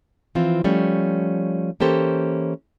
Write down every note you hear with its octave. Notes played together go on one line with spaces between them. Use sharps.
E3 F3 C4 F4
F3 G3 A3 C#4
E3 A#3 C#4 G4 A4 C5